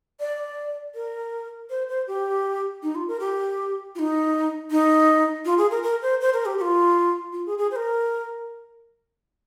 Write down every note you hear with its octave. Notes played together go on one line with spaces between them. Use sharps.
D5
A#4
C5
C5
G4
D#4
F4
A#4
G4
F4
D#4
D#4
F4
G#4
A#4
A#4
C5
C5
A#4
G4
G4
F4
F4
G#4
G#4
C5
A#4